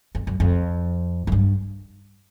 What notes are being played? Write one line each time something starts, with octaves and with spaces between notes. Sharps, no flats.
F2
F#2
F2
F#2
G2